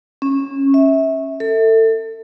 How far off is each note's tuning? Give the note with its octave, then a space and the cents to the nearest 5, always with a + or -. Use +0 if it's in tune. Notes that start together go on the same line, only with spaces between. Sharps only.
C#4 -15
E5 -25
A4 +25